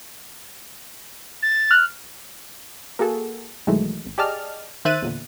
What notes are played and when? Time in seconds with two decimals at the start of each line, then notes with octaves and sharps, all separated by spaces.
1.42 A6
1.71 F6 F#6
2.99 A#3 F#4 G#4 A4
3.67 B1 D#3 E3 F#3 G#3 A3
4.06 G#1
4.18 G4 G#4 D5 D#5 A5 F6
4.85 D#3 C5 E5 F#6 A6 D#7
5.02 E2 A#2 D3